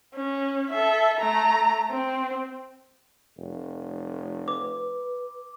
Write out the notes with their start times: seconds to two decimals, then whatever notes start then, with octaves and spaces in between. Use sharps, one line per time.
0.16 C#4
0.70 A4 E5
1.20 A3 A#5
1.91 C4
3.38 F1
4.48 B4 D6